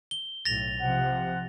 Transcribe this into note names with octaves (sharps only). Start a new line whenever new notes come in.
G7
B1 A2 A6 A#6 F7
C3 F3 F#5